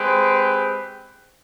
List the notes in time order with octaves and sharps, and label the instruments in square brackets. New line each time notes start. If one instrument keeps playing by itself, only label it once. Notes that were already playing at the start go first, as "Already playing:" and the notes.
Already playing: [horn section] G#3 C4 G4 B4